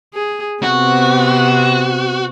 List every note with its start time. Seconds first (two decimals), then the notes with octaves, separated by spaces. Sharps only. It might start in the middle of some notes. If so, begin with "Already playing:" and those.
0.14 G#4
0.63 C3 B3 C4 F#4